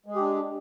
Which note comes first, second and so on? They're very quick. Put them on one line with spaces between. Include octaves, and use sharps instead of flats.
G#3 G#4 G4 D4